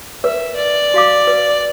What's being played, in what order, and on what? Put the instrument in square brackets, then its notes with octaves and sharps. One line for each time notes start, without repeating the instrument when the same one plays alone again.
[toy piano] A#4 B4 [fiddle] E5
[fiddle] D5
[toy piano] F#4 F5 D6
B4